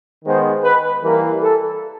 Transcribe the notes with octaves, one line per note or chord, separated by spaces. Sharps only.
D#3 G#3 B3 C5
B4
E3 G3 A#3 A#4
A4